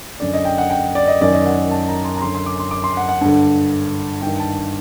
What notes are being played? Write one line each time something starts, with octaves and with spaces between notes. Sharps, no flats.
F#2 D3 D5
D#5
G5
F#5
G5
D5
D#5
F#2 D#3 D5
D#5
F#5
A5
A#5
C6
A#5
F#2 D3 C6
C6
D6
C6
D6
C6
F#5
F#5
G2 D3
G2 D#3 G5
A5